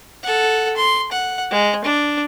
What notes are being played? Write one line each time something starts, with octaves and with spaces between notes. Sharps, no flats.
A4 F#5
C6
F#5
G#3
D4